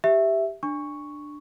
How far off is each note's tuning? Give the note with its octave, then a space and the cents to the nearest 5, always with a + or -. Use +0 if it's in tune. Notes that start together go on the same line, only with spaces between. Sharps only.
G4 +0 E5 +0
D4 +15 C#6 +0